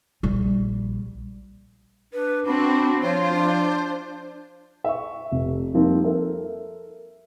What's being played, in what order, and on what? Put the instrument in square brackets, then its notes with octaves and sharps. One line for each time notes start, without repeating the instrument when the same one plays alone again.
[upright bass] A#1 G3
[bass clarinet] D4 [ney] B4
[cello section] C4 F#4 [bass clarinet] D4 [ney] B5
[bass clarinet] F3 [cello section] F4 [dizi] C5 [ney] C#5
[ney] D4
[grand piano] E5 C#6
F1
F3 G3 A#3 C4 D#4
A4 A#4 E5